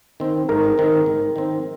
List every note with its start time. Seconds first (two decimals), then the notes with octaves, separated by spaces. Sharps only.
0.20 D#3 C4
0.49 G#2 A#4
0.78 D#3 C4
1.06 G#2
1.36 D#3 C4